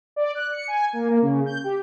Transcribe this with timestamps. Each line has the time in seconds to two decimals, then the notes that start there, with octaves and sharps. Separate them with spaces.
0.16 D5
0.35 F#6
0.53 C#7
0.68 G#5
0.93 A#3
1.10 A#3
1.22 C#3
1.46 G6
1.64 G4